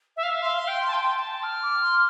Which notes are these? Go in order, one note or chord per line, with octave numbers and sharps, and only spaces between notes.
E5
F5
E5
F5 C6
F5
G5
A5
G5
A5
F6
D6
C6